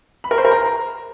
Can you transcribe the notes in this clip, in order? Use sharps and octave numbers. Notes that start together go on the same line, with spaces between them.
B5
A#4
C5
A#4
A#5